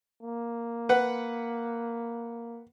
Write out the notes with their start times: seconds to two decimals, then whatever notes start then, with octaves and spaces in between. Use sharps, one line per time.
0.23 A#3
0.89 B4 F#5